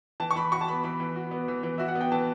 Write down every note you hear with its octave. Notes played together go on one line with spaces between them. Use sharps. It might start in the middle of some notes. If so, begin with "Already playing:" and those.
E3 A5
C#6
E3 B5
F#4 C#6
A5
B3 B5
E3 B5
E3
F#4
B3
E3
E3
F#4 E5
F#5
B3
G5
E3 A5